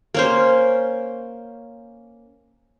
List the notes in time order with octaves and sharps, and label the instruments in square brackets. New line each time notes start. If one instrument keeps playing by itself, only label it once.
[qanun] A#3 C#4 C5